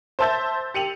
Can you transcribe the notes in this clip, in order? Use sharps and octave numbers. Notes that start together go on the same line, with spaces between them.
C5 E5 A5 E6 G6 A6
G4 C#7 D#7 F7 F#7